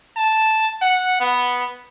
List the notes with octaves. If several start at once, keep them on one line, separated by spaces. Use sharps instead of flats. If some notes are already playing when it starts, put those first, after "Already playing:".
A5
F#5
B3